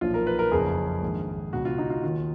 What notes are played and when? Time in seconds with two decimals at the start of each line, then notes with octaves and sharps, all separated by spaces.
0.01 B1 A#2 F3 F4
0.14 A#4
0.27 B4
0.39 A#4
0.52 F#1 F2 C#3 F3 G#4
1.02 A#1 G#2 D#3
1.53 C#2 B2 F#4
1.65 F4
1.78 D#4
1.90 F4
2.03 D#2 D#3 F4